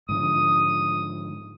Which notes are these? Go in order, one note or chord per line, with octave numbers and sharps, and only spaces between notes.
G#2 D3 F3 D#6